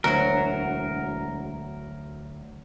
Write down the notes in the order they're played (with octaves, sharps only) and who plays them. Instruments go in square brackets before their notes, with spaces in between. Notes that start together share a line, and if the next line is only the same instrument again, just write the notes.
[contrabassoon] E1 [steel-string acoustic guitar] D2 [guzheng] F#3 F#4 [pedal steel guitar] A#4